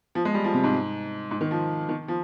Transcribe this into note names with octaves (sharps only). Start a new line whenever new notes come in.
F3
G#3
G3
F3
C3
G#2
G#2
D#3
F3
D#3
F3